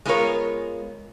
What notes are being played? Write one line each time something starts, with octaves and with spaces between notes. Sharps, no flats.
G#3 A3 B3 F4 A#4 C#5